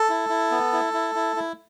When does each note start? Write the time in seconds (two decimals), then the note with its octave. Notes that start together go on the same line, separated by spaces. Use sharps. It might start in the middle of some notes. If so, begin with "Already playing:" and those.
Already playing: A4
0.09 E4
0.29 E4
0.51 B3
0.73 E4
0.93 E4
1.15 E4
1.36 E4